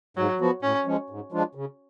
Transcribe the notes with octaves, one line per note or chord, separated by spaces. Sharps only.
G#2 F#3
F3 B3 F#4
A2 C#4
F3 G#3 C#4
G#2
F3 G#3 D4 F4
C#3